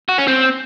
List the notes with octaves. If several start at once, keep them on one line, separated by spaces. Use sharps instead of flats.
F#4
C#4
C4